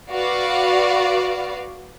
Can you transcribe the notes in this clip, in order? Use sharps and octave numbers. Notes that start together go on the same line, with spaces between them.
F#4 B4 D5 F5